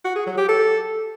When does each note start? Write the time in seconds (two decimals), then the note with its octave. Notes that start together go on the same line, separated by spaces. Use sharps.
0.05 F#4
0.16 G#4
0.27 F#3
0.38 G4
0.49 A4